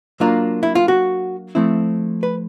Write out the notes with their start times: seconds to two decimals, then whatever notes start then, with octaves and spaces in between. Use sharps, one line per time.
0.20 F#3 A#3 D4 F4
0.63 E4
0.75 F4
0.88 F#4
1.55 F3 A3 C4 E4
2.23 B4